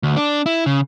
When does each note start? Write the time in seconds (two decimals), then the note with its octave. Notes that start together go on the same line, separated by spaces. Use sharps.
0.03 D2
0.17 D4
0.46 E4
0.66 C#3